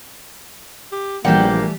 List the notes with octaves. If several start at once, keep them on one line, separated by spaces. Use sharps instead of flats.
G4
A#1 E3 G3 A3 A#3 F#5 G5